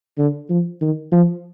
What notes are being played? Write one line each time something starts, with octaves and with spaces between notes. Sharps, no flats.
D3
F3
D#3
F3